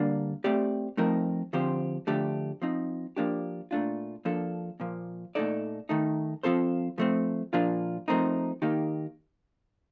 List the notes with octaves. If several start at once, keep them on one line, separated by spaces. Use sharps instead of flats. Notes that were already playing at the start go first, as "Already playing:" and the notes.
Already playing: D3 G3 A#3 D4
A3 C4 G4 D5
F3 A3 C4 D#4 A#4
D3 F3 C4 G4 C5
D3 F3 A3 D4 G4
F3 C4 D#4
F3 A#3 D4 G4
A#2 A3 D4 F4
F3 A#3 D4 A4
A#2 F3 A#3
A#2 A3 D#4 A4 D5
D#3 A3 D#4
F3 C4 F4 A4 C5
F3 A3 C4
A#2 F3 A#3 D4 F4
F3 A3 C4 D#4 A#4
D#3 A#3 D#4 G4